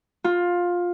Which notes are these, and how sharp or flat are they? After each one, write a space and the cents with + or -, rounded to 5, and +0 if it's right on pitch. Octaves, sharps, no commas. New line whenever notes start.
F4 +15